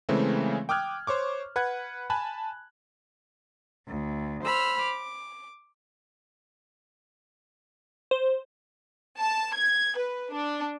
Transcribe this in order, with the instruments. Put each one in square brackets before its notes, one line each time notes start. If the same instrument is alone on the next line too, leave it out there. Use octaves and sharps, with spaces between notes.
[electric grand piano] C#3 E3 G#3 A3 C4
G5 D6 D#6 F6 F#6 G#6
C5 C#5 C#6 D6
B4 F#5 F#6 G#6
G#5 A5 B5 F#6
[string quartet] D2
C5 B5 E6 F6
D6
[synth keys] C5
[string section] A5
G#6
B4
D4